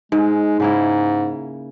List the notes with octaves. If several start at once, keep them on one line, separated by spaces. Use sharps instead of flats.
G#2 G#3
G#2 C#3 A#3 E4